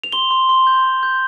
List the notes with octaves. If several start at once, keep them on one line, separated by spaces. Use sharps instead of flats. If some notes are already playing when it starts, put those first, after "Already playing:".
F7
C6 G7
C6
C6
G6
C6
G6